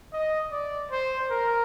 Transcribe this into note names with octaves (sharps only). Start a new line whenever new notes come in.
D#5
D5
C5
A#4